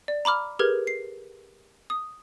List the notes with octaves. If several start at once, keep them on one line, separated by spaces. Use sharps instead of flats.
D5
A#5 B5 D6 F6
G4 G#4 A#4 B4 F6 G#6
C7
D#6